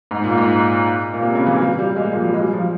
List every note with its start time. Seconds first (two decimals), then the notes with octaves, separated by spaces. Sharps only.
0.11 G#2
0.24 A#2
0.38 G#2
1.14 A#2
1.23 C3
1.35 C#3
1.47 E3
1.60 G3
1.79 G3
1.96 G#3
2.07 A#2
2.16 F3
2.24 G3
2.34 G#3
2.43 G3
2.53 F3